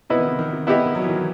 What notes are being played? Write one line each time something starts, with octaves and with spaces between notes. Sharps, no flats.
C3 B3 E4 B4 D#5
D#3
C3
D#3
C3
B3 E4 G4 D#5
D#3
F#3
E3
D#3
E3